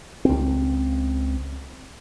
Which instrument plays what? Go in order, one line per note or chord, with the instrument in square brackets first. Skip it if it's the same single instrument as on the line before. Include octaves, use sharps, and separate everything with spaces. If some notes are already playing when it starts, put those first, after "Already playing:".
[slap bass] C#2 C4